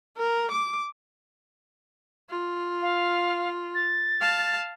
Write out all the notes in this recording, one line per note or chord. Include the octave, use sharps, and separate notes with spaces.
A#4
D6
F4
F5
A6
F5 A5